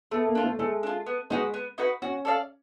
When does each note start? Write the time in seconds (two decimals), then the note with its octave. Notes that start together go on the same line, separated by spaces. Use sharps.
0.11 A3 B3
0.27 A#3
0.35 D4 F4
0.43 A3
0.59 G#3 A3
0.83 D4 F4
1.06 B3
1.30 G#3 D#4 F#4 B4
1.54 B3
1.78 D#4 F#4 B4
2.02 C#4 F#4
2.25 A4 D5 F5